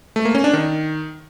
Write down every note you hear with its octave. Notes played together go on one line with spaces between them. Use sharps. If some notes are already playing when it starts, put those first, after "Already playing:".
A3
A#3
C#4
D4
D#3